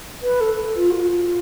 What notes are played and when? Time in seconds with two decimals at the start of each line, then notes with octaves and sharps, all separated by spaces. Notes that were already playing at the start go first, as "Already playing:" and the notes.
0.22 B4
0.41 A4
0.76 F4
0.90 F#4
0.95 F4